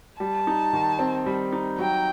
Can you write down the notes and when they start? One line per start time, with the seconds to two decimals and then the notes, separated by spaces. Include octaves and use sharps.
0.20 G3 A5
0.47 D#4
0.73 D#3
0.99 C4
1.26 G3
1.52 D#4
1.79 F#3 G5